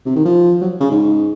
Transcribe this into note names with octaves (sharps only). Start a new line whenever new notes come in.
C3
D#3
F3
F#3
C#3
G#2